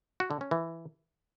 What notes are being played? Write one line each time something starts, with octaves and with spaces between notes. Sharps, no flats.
F#4
D3
C#4
E3